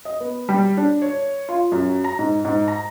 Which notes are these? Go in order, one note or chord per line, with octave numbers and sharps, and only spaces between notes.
D#5
B3
G3
D4
C#5
F4
F#2
A#5
G#2
G#2
A#5